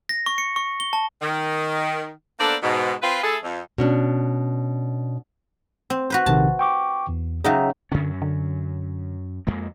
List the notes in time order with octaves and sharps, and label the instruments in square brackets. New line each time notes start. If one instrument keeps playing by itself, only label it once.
[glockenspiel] A#6
C#6
C#7
C#6
G7
A5
[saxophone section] D#3
A#3 B3 D4 A4 C5 D5
G#2 B2
C4 F4 B4
A3 E4 G#4 A4
F2
[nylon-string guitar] B2 C#4 D4
[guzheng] C4
F#4 B4 C5
[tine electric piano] A#1 C3 D#3 [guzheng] A5
[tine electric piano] G5 C#6 D6
E2
[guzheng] C#3 F#3 D#4 [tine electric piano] G#4 E5 G5
[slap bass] F#2 C#4 [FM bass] D3
[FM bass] D3
[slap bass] F2 G#3 A#3